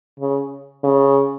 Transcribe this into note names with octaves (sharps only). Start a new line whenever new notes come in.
C#3
C#3